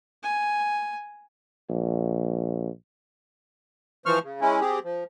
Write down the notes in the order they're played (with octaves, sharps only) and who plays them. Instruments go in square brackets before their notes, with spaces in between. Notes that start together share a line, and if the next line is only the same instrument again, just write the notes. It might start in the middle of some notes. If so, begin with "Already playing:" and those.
[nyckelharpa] G#5
[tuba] A#1
[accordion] E3 F3 C5 C#6 F6
C#3
G#3 C#4 E4
C4 G4 G#4
F3